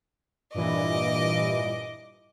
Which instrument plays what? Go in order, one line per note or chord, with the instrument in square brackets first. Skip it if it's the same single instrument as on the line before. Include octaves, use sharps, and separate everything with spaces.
[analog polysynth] G2 A#2 E3 [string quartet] D#5 D6